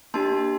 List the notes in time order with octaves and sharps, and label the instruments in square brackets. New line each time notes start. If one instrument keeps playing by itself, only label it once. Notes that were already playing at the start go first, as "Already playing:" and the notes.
[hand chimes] A#3 D4 G4 A5 C6